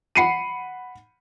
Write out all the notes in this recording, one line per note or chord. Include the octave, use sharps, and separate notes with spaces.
F#5 B5 C7 C#7 D#7